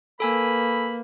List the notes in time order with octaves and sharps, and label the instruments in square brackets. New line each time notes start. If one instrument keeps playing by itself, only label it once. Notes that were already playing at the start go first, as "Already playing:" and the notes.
[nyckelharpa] A#3 B4 [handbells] A4 G#5 E6 [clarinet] B5